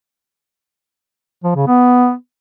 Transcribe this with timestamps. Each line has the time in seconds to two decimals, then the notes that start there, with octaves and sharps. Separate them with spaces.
1.44 F3
1.56 C#3
1.67 B3